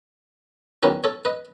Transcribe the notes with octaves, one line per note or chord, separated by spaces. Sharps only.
E2 D#3 F#3 C#4 G#4 B4
A4 C#5
B4 D#5